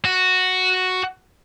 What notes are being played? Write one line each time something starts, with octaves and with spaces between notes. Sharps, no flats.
F#4